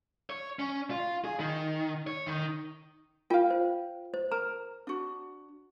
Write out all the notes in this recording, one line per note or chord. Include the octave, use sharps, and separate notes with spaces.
C#5
C#4
F4
G#4
D#3
C#5
D#3
F4 A#4 F5 G5
C5
C5
A#4 A#5
D4 F#4